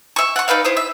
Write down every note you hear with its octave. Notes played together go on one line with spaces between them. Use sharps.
E5 C#6
F#5 C#6
D#4 B4 D5 F5
E4 C5 D#6
E5